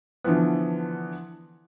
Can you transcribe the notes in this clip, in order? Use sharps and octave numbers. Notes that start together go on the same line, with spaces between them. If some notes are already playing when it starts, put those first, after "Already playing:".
D3 E3 F3 B3